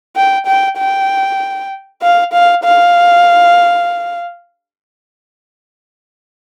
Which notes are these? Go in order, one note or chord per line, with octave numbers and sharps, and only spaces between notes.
G5
G5
G5
F5
F5
F5